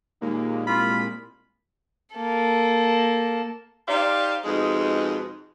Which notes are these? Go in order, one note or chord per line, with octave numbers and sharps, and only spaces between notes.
D#2 A#2 G#3 A#3
C2 F4 B5
A#3 A4
D#4 G4 C5 D5 F5
F2 B2 G#3 D#4